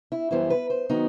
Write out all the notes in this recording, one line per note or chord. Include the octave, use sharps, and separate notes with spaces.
E4
F#2 E3 G3 B3 E4 C5
B4
C5
D#3 F#3 B3 D#4